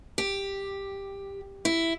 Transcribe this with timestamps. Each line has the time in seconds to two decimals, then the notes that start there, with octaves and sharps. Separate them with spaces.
0.18 G4
1.65 E4